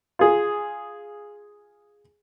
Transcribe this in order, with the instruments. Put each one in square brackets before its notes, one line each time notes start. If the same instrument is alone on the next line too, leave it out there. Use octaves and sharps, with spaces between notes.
[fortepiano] F4 G#4